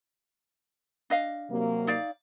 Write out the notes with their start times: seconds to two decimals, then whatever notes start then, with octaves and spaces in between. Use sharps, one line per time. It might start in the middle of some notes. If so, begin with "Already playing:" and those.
1.10 D4 D#5 F5
1.50 C3 F#3 A#3
1.87 D#4 D5 F5